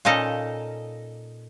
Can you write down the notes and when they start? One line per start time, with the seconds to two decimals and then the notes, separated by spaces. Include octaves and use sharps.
0.05 A#2 C#4 D#4 A4 D#5